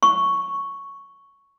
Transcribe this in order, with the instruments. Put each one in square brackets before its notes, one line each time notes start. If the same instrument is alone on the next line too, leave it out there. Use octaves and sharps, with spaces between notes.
[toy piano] C#6